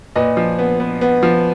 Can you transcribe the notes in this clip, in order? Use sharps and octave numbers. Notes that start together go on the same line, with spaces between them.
A#2 B4 D#5
F3
B3
B3
B3
F3